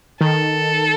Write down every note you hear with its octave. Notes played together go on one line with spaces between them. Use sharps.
D#3 A4